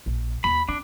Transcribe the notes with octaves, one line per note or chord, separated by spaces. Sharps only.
A#1
D#2 B5
C4 D4